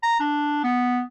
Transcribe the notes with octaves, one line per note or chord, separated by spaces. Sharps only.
A#5
D4
B3